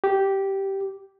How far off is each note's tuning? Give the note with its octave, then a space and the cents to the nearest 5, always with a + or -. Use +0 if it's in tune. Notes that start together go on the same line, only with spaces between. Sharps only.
G4 -10